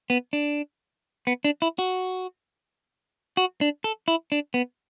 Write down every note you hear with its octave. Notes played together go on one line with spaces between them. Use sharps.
B3
D4
B3
D4
E4
F#4
F#4
D4
A4
E4
D4
B3